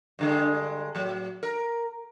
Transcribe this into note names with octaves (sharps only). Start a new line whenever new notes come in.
G2 D3 G#3
A2 F#3
A#4